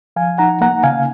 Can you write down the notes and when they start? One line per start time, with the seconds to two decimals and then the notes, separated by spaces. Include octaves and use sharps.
0.16 F3 F5 G#5
0.38 D#4 F#5 A#5
0.61 A#3 F#5 A#5
0.83 C#3 F5 G#5